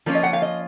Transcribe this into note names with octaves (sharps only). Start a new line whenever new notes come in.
F3 A#3 C#4 F4
D#5
F#5
F5
D#5